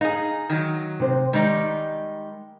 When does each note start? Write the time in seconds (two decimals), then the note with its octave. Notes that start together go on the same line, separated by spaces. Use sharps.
0.01 D#4 G#4 F5
0.49 D#3 F#3
1.00 C3 C5
1.33 D#3 G3 G#3 D#4